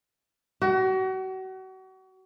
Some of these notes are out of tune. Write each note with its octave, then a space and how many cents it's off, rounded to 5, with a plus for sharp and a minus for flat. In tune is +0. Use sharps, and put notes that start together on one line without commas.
F#4 +35